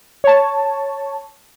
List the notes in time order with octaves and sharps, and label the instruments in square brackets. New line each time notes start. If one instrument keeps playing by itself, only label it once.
[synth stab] C#5 A5